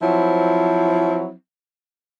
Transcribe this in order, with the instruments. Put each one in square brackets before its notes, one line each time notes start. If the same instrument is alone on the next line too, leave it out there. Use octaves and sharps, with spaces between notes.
[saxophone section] F3 F#3 C4 E4